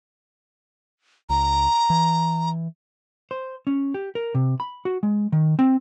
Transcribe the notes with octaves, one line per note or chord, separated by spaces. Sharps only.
C#2 A#5
E3
C5
C#4
G4
A#4
C3
B5
F#4
G#3
D#3
C4